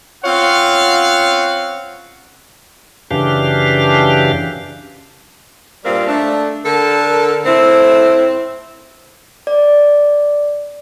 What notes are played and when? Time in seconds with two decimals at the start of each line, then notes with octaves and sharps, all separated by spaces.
0.24 C4 C#4 F4 C#5 F5 F#5
3.11 F#2 C#3 E3 D4 G4 F5
5.85 G2 A#2 G3 C4 A#4 F5
6.07 A3 D4
6.65 D3 A4 A#4
7.46 A2 C4 E4
9.47 D5